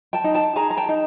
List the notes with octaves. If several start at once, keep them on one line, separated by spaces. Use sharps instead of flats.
G5 A5
D#4
G5 A5
G#4 G#5 A#5
A#5
G5 A5
D#4